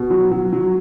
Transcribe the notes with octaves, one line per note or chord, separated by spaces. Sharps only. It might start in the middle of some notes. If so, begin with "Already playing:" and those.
Already playing: B2
F#3
F#3
F#3